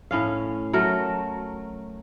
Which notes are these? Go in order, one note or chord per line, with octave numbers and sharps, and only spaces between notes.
A2 C#4 F5
F#3 A3 A#4